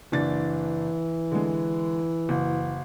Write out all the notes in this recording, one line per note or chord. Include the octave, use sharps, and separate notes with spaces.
F#1 E3 D4 A6
D3 G#3
F#1